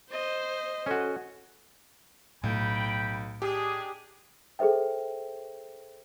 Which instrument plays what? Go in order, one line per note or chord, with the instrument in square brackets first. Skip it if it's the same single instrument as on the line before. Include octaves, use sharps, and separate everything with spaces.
[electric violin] C5 [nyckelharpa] D#5
[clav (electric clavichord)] C#4 F#4 [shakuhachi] A4
[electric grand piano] B1 [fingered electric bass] A2 A3 [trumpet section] G5 B5
[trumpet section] G#3 D4 G#4 [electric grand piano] G4
[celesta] G#4 A4 C5 E5 G5